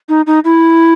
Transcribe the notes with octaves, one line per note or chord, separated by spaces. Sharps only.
D#4
D#4
E4